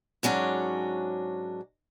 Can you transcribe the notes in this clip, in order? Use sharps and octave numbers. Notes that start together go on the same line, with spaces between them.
G#2 F#3 C#4 D4